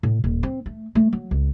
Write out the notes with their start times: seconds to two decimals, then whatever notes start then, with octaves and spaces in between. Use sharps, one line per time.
0.03 A2
0.24 D#1
0.43 C4
0.66 A3
0.95 A3
1.13 F#3
1.31 C#2